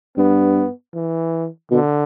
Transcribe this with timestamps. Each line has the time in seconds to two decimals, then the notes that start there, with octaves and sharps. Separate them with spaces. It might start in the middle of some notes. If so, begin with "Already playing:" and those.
0.17 G2 B3
0.94 E3
1.71 B2 D3